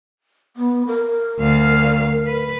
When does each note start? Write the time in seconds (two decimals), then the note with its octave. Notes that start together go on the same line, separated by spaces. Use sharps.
0.57 B3
0.87 A#4
1.39 D2 F5
2.27 B4